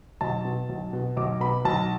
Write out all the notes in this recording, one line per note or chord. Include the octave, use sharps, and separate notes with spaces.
B1 A5
B2
B1
B2
B1 D6
B2 B5
B1 A5